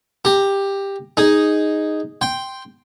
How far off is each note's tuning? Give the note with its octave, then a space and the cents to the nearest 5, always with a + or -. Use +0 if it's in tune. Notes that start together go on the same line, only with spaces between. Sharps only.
G4 +10 A#5 +0
D#4 +0 G#4 -5
G5 +0 C6 +0